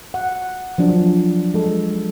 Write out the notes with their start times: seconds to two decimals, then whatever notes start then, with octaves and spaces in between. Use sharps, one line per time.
0.14 F#5
0.78 F3 F#3 D4
1.54 G#3 A4